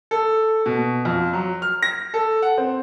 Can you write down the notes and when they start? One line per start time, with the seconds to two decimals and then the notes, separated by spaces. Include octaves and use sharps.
0.11 A4
0.66 B2
1.05 F2
1.33 F#3
1.62 F6
1.83 A#6
2.14 A4
2.42 F#5
2.58 C4